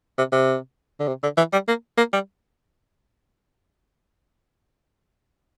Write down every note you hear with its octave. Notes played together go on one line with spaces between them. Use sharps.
C3
C3
D3
C3
D3
E3
G3
A#3
A#3
G3